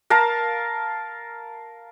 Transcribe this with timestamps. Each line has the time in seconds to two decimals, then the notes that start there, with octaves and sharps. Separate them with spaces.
0.10 A#4 F5 A5 A#5